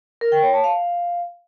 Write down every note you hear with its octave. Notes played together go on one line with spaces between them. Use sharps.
A#4
G5
C#5
A5
F5